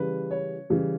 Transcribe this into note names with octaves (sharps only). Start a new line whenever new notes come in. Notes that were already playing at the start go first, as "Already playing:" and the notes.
Already playing: C#3 E3 G3 B4
C#5
C#3 E3 G3